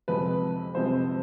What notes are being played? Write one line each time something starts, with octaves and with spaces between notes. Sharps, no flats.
F2 C3 F3 G#3 B4
F2 C3 F3 G#3 C5